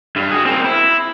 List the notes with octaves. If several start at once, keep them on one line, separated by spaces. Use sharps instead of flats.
G2
F#4 G#4
C4 A#4
E4